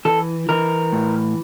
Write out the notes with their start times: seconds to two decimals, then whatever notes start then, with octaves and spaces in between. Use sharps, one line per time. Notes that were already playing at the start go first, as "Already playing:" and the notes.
0.05 E3 A4
0.49 E3 A#4
0.92 A2